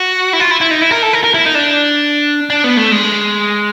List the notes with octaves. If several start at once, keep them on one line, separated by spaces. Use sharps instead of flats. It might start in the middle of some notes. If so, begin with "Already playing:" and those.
Already playing: F#4
E4
F4
E4
E4
D#4
E4
A#4
A4
A#4
A#4
E4
D#4
D4
D4
B3
A3
G#3